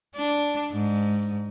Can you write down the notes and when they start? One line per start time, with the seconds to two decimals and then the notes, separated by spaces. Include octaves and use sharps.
0.16 D4
0.72 G#2